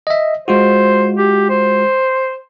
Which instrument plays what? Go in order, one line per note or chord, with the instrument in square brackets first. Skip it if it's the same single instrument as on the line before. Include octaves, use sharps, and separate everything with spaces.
[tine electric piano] D#5 E5
[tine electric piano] G#3 F4 F#4 [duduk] C5
[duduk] G4
C5